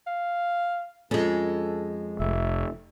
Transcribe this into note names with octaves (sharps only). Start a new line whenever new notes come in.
F5
F2 G#3 C#4 A4
F1 E5